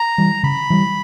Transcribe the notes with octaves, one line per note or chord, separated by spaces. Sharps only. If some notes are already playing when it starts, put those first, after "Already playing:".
Already playing: A#5
E3 G3
C#3 B5
E3 G3